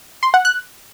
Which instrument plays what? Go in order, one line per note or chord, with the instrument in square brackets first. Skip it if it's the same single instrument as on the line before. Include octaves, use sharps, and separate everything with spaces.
[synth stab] C6
F#5
F#6